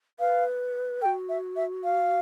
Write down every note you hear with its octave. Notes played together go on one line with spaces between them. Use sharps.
B4 F5
A4 G5
F#4
E5
E5
F5